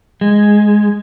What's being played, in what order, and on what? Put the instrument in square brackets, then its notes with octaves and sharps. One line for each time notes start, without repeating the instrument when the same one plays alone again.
[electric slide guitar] G#3